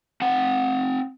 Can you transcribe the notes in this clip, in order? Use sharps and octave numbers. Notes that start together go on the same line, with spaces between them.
C4 F#5